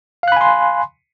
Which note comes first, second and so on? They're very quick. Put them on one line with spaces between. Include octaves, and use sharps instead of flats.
F5 F#6 B5 G#5 C6